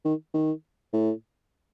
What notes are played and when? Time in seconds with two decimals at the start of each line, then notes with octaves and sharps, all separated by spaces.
0.05 D#3
0.34 D#3
0.93 A2